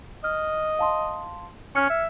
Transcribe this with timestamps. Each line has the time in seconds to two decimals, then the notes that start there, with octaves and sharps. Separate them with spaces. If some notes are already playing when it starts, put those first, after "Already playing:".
0.24 D#5 F6
0.79 F5 A5 C6
1.76 C#4 F6 G#6 C#7
1.90 E5